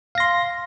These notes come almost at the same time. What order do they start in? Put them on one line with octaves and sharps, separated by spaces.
F5 A#6 C6